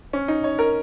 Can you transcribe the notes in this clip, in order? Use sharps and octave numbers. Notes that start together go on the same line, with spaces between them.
C#4
D#4
C#5
A#4